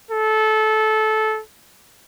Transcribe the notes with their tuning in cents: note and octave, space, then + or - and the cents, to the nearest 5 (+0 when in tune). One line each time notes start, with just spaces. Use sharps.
A4 -20